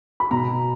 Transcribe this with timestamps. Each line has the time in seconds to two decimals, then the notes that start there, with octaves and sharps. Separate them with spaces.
0.20 B5
0.31 B2 A#5